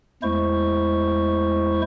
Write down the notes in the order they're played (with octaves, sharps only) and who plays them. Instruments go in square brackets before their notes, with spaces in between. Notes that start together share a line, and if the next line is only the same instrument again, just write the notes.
[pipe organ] E2 G#3 A3 E4 C5 C#6